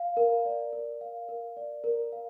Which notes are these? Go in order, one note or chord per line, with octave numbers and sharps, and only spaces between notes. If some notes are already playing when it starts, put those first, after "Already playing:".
Already playing: F5
A#4
D5
A#4
F5
A#4
D5
A#4
F5